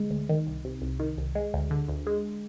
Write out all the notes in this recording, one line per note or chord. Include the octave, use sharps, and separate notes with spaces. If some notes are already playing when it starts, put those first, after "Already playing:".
Already playing: D2 G#3
D2
D#3
C2
C3
C2
D#3
C2
G#3
D2
D3
D2
G#3